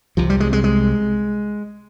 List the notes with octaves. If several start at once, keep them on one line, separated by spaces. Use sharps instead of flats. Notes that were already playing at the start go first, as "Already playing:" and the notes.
C2 C3 F3
G3
G#3
G#3
G#3